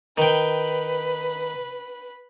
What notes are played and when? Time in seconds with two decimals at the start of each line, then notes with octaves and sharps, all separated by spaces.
0.18 D#3 B4 G5